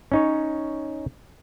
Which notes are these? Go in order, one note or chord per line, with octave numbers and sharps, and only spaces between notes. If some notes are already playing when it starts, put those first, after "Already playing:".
C#4 D#4 C#5